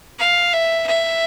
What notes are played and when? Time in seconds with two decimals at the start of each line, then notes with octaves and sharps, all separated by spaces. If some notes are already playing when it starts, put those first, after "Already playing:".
0.19 F5
0.53 E5
0.87 E5